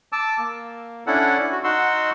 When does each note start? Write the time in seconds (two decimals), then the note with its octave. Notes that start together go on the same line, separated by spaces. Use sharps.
0.12 A5 D6 E6
0.39 A#3
1.07 C#4 D4 E4 A4 F#5
1.52 F#4
1.64 D#4 F#4 F#5 C6 E6